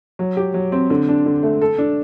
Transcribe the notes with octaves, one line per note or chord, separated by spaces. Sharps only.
F#3
G4
F#3
C4
D3
D4
D3
A3
A4
D4